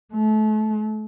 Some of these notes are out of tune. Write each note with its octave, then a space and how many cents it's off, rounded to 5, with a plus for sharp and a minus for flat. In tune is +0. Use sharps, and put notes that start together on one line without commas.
A3 -30